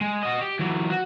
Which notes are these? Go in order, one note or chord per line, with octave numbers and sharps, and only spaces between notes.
G#3
F#4 D#5
G4
E3 F#3
F#4